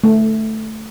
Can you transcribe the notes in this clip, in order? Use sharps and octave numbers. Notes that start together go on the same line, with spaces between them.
A3